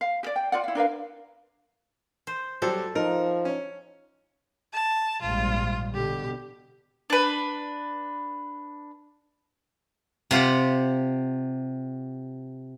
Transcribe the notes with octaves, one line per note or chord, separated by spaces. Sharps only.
F5
G4 D5
G5
F4 D5 F#5
E4 F5
D4 A#4 B4 F5
C5
F#3 G3 G4 A4 C5
F3 D#4 A#4
C#4
A5
A#1 G#2 G3 F4
B2 D3 G4
D4 B4
C3 F4 G4 F#5